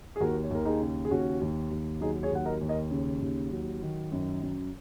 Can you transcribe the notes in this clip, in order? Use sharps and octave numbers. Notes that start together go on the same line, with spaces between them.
G#4
D#2 F#4 A#4
C#5
D#2 A#4
D#4 G#4
C#3
G#4
D#2 C#4 F#4
D#2
D#2
F#3 D#4 G#4
G#4 C#5
D#2 F#5
A#4 D#5
D#2
A#4 D#5
C#3
D#2
F#3
D#3
F#2
F#2